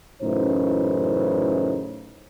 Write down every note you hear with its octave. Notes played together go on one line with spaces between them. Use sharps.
F#2 A2 C#3 E3 D#4 C5